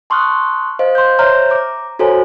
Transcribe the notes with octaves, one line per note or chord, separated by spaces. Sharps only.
A5 C6 C#6 D#6 F6 F#6
C5 D#5 F5
C6 G6
C5 C#5 E5 A#5 F6 G6
A#5 D6
F#4 A4 C5 C#5 G#5 A#5